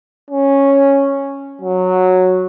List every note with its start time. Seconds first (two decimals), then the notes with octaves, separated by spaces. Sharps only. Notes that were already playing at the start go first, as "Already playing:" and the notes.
0.31 C#4
1.62 F#3